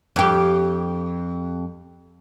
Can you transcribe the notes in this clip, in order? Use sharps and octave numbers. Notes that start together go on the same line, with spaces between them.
F2 G4